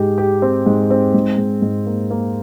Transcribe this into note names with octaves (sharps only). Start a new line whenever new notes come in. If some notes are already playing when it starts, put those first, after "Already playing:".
Already playing: G#2 G4
G4
C4
G#2
C4
G#2
G#2
G#2
A#3
A#3